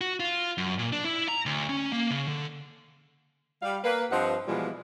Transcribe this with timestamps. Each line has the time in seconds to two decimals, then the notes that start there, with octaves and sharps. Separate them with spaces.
0.01 F#4
0.20 F4
0.58 F#2
0.79 A#2
0.92 D4
1.05 E4
1.28 A#5
1.46 D2
1.69 C#4
1.93 A#3
2.10 C#3
2.28 D3
3.63 G3 F5
3.84 A#3 B4
4.11 G2 F3 C4 D#5 F#5
4.47 B2 E3 F3 G3 G#3 F4